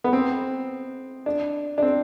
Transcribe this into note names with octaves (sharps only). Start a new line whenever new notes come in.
B3
C4
D4
D4
C4